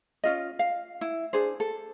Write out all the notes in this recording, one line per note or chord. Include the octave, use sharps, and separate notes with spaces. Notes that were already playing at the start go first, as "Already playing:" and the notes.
C#4 F4 D#5
F5
E4
D4 G#4 C5
A4